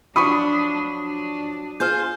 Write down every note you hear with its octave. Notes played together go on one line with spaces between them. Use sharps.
F3 F#3 D4 B5 C#6 D#6 D#7
D4
F4 G#4 C5 F6 G6